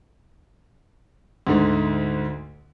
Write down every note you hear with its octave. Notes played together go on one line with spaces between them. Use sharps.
D2 G#2 D3